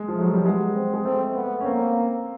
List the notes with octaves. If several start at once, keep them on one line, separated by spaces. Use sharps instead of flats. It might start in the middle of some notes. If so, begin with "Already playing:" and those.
Already playing: G#3
F3
A3
F#3
G3
G#3 B3
C4
G#3
A3 C4
B3
C#4
A#3 C4